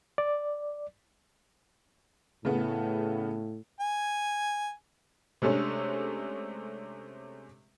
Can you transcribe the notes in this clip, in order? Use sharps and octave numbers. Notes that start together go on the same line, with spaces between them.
D5
A2 C#3 A3 B3
G#5
C3 G#3 A3 C#4 D4